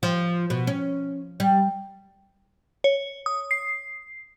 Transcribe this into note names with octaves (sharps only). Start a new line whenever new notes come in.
F3
B2
C#4
G3
C#5
D#6
C7